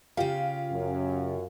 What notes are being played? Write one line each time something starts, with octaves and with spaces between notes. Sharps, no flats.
C#3 F4 G4
F#2